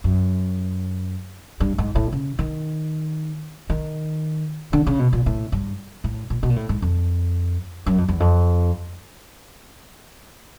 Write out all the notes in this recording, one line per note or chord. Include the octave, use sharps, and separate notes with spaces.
F#2
G2
G#2
A2
C#3
D#3
D#3
D3
C#3
B2
A#2
A2
G2
A2
A#2
B2
A#2
A2
G#2
F2
F#2
F2
E2
F2